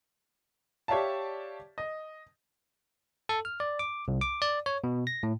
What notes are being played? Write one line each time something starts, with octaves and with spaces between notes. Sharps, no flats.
G4 C#5 D5 E5 F5 A5
D#5
A4
F6
D5
D6
C2
D6
D5
C#5
B2
A#6
A2